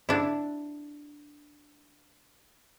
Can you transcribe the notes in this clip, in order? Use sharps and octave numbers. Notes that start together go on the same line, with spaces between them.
D4 E4